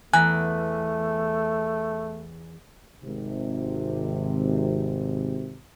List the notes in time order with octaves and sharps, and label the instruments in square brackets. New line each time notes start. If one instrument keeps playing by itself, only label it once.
[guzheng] E2 [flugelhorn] A3 [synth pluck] G#5 A#5 [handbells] F#6
[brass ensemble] G#1 C3